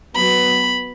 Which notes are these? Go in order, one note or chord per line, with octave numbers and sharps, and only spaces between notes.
F#3 B3 B5